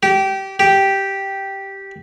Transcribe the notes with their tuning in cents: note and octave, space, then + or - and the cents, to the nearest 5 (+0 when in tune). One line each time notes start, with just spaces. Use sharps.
G4 -20
G4 -5